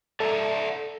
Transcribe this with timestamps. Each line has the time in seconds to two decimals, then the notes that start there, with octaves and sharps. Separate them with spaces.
0.20 A4 D5 E5 A#5